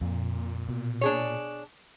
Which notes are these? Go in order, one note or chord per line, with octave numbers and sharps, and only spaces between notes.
F2 A#2
B2
D4 G#4 C#5